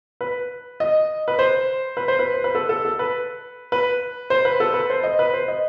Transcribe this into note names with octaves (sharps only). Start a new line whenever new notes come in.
B4
D#5
B4
C5
B4
C5
B4
C5
B4
A4
A4
A4
B4
B4
C5
B4
A4
B4
C5
D#5
B4
C5
D#5